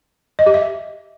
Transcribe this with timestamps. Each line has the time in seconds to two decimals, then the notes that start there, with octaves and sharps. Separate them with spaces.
0.39 D#5
0.46 G4
0.54 E5